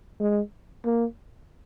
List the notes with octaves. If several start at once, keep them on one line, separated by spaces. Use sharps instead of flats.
G#3
A#3